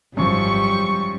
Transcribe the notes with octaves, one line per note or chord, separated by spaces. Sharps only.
G#1 F#2 F3 G3 C#6